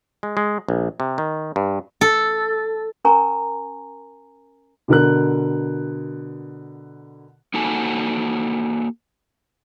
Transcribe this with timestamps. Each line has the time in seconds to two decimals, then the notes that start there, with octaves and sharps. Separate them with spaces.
0.23 G#3
0.37 G#3
0.69 A#1
1.00 C3
1.18 D#3
1.56 G2
2.01 A4
3.05 C#4 A#4 G#5 A#5 C#6
4.88 B2 D3 A#4 F#6
7.54 A#3 D#4 F#4 A4 F#5 G#5